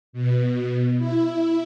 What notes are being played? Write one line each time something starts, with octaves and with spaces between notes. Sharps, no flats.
B2
E4